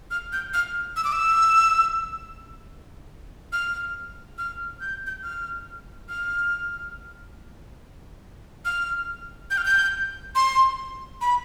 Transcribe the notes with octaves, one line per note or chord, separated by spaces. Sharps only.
F6
G6
F6
E6
D6
E6
F6
F6
G6
G6
F6
F6
F6
G6
F6
G6
C6
B5